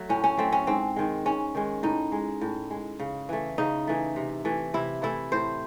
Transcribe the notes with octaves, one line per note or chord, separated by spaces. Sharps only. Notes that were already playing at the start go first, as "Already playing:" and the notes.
Already playing: F#3 A3
A2 C#4
C#4
F#3 A3 C4
C#4
G#2 C4
D#3 G#3
G#2 C#4
D#3 G#3
A2 D#4
G#3
A2
G#3
C#3
E3 A3
C#3 D#4
E3 A3
C3
E3 A3
C3 E4
E3 A3 E4
A2 C5